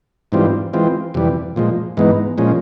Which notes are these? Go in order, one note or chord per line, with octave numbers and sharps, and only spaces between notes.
G#2 E3 G3 C4 F4
E3 G#3 C4 F4
F2 C3 E3 G3
A#2 F3 G#3
G#2 E3 G#3 B3 D#4
A#2 F3 G#3 C#4